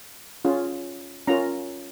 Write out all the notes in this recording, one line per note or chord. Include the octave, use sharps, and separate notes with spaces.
C#4 F4 G#4
C#4 F4 A#4 A#5